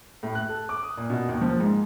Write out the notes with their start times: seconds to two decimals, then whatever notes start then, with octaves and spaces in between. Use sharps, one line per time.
0.23 A2
0.35 F#6
0.49 A4
0.69 D6
0.83 D#6
0.97 A#2
1.10 B2
1.28 D#2
1.41 F3
1.60 G#2